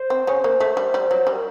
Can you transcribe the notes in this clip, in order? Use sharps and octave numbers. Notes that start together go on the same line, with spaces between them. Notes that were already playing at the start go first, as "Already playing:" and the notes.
Already playing: C5
C4
C#3 C#4
A#3
A3
G3
G3
F#3
G3
A#4